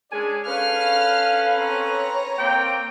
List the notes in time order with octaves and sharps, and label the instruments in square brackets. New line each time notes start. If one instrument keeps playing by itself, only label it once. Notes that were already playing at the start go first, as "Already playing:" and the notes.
[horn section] G#3 G#5 [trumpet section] C#4 D4 D5 [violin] G#4
[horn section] C#4 A4 B4 [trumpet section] F5 [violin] F6
[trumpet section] C4 [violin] C#5 A#5
[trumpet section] A#3 [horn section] C4 G5